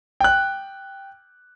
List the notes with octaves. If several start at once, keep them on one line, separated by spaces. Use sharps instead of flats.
G5 F#6